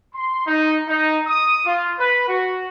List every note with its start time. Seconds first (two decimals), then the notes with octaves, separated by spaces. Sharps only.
0.15 C6
0.46 D#4
0.89 D#4
1.27 D#6
1.66 F4
1.99 B4
2.28 F#4